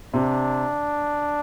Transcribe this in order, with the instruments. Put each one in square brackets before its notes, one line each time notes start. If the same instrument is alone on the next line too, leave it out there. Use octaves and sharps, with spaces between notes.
[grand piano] C3 [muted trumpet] D4